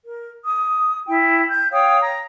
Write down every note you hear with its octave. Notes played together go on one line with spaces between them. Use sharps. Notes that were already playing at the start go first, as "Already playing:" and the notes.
A#4
D#6
E4 G5
G6
C#5 F5 G5 D#6
A#5